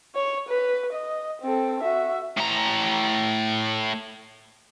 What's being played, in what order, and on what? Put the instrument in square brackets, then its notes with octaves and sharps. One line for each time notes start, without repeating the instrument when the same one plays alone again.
[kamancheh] C#5
B4
D#5
C4 A4
F#4 E5
[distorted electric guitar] A2 A#5